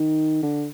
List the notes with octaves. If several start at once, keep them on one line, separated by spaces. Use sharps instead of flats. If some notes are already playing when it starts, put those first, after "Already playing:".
Already playing: D#3
D3